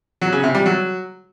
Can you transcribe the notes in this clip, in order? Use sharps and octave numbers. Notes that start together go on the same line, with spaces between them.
F#3
C#3
C3
G3
F#3